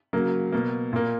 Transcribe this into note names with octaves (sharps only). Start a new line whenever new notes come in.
C#3 F#3 A#3
B2 A#3
A#2 A#3